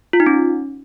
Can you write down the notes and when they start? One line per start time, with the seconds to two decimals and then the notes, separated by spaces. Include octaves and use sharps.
0.13 F4
0.20 D#4
0.26 C#4